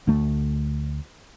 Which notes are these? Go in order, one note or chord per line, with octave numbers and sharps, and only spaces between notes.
D2 A3